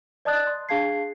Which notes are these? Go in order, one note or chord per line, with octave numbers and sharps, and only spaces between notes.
D5 D#5 A5 D#6 F#6 A6
C6
D4 G#4 F5 A5 G#6 C7